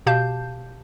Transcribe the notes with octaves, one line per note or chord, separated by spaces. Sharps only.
B2 G4 F5 A5 G6